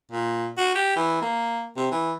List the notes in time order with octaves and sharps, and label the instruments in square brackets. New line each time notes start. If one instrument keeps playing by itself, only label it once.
[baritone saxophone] A#2
F#4
G4
E3
A#3
C3
E3